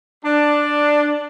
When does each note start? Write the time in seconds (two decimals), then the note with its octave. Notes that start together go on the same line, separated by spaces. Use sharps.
0.25 D4